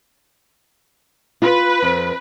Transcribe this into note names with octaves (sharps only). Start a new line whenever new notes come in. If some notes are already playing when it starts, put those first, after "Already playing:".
F4 B4
F2